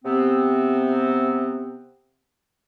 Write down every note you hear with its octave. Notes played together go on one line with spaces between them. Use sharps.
C3 B3 C4